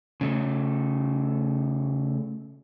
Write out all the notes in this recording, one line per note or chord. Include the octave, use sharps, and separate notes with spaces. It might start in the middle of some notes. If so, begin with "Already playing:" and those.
C#3 A3